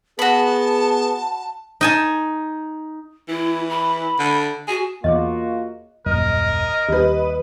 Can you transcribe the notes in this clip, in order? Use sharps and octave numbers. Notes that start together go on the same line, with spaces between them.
B3 F#4 G#4 A5 B5
D#4 G#5 A5
E3 E4
B5
D3
F#4 G#4
E2 A#3 F4 F#4 G#4 C#5 D#5
D#1 G#1 F#2 A#4 D#5
D#2 G3 B4